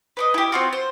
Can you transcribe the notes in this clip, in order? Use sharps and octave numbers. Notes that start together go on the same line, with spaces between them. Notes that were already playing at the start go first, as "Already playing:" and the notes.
B4 D5 D#5
E4 G4
C4 F4 F#4
C5